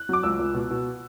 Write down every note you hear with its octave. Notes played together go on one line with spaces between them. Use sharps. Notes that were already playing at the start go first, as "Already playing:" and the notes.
Already playing: F#6
F#3 D6
C#2 E6
C#2
B2
B2